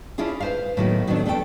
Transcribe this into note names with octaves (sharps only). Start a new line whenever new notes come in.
C#4 D4 E4 F4 G#4
B4 C5 F5
A2 D#3 F#3 A#3 B3
D#3 F#3 A3 B3 C4 D4
E2 A3 D4 A4 C#5 G5